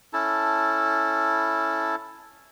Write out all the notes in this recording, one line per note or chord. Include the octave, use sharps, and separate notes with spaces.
C#4 E4 A4 A5